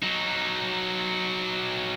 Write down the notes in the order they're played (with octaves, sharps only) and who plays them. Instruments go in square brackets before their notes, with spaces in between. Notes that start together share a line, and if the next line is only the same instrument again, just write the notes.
[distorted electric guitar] F#3 D#4